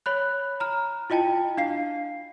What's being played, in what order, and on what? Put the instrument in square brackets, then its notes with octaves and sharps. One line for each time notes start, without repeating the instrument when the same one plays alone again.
[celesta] C#5 B5 F#6
A#5 F6
E4 F4 D#5 G5 A5
D4 F5 C7